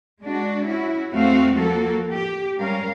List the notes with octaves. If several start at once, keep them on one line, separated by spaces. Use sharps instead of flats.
G#3 D4 F#4
C#4 E4 F#4
E2 A3 C4 F#4 F5
F3 A#3 F#4 A4
G4
G#2 G3 C#4 A#4 F5